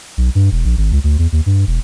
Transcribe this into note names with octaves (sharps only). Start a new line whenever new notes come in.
B1
G2
E1
A#1
G#1
C#2
D2
E2
D#2
G2
E1